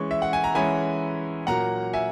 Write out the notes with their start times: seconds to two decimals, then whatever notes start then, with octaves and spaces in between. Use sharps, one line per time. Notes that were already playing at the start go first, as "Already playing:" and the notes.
Already playing: E3 G#3 C#4 C#6
0.11 E5
0.22 F#5
0.33 G#5
0.44 A#5
0.55 E3 G#3 C#4 G#5 B5
1.47 A#2 F#3 A#3 F#5 A#5
1.93 E5 G#5